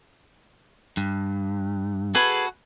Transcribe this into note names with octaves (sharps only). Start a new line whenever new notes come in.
G2
F#4 G#4 A4 B4